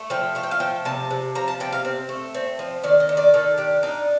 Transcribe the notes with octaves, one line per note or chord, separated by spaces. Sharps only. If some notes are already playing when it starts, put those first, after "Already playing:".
Already playing: A3
F3 G5
A3 F5
G5
F5
F3 G5
C3 A5
C3
F3 A#5
A5
C3 G5
F5
C4
A3
C4
F3
D#3 D5
D#5
D#3
D5
D#3 A4
D4 G4
D4 D#4